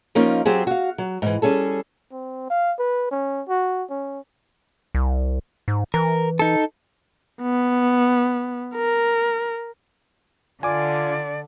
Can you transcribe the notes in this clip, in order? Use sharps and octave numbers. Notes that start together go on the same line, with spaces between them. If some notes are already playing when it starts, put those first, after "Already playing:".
F3 A#3 C#4 D#4 F4 A#4
F#3 C4 F4 G4 G#4
F#4 F5
F#3
G#2 E3
G3 C#4 G#4 A4
C4
F5
B4
C#4
F#4
C#4
C2
G#2
E3 A#4
D#4 A4
B3
A#4
D3 F4 D5 G#5 D6